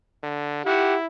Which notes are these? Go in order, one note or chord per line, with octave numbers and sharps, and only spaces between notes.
D3
E4 G4 F#5